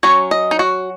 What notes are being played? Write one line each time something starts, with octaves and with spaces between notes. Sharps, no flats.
F#3 C#4 C#5
D#5
D#4
F#4